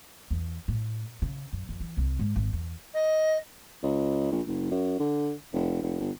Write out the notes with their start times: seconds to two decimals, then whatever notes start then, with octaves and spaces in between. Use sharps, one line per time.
0.31 E2
0.68 A2
1.22 C#3
1.53 F#2
1.69 F2
1.80 E3
1.97 C2
2.19 G#2
2.36 G#1
2.53 E2
2.94 D#5
3.83 C#2
4.31 A#1
4.47 F#1
4.71 F#2
4.99 D3
5.53 F1
5.83 F1
6.00 G1